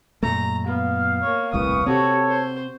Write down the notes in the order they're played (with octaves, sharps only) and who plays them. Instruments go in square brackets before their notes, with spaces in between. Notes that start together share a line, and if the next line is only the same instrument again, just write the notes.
[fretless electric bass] F#2 A#2 A3 [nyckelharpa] A#5
[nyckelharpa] B3 [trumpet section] F5
[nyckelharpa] A#3 C#5
[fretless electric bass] D#1 C2 A2 [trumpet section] B4 F5 C#6 [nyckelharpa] D#6
[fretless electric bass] C3 C4 [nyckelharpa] F#4 G4 [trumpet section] A4 C#5
[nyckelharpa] C5